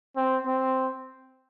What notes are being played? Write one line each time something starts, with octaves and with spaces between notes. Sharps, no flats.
C4
C4